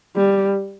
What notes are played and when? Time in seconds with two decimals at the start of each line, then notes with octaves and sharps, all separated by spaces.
0.16 G3